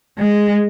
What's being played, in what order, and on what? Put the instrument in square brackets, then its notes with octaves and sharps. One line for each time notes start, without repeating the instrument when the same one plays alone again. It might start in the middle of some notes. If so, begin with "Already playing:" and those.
[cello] G#3